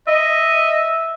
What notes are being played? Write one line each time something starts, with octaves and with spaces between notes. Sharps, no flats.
D#5 E5